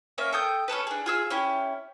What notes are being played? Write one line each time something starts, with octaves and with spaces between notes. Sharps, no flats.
A#3 C#4 A#4 E5
A4 G5 D#6 G6
C#4 D#4 A4 B4
D4 G#4
F4 G#4 E6
C#4 E4 G4